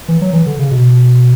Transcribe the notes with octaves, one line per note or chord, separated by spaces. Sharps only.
E3
F#3
E3
D3
C#3
B2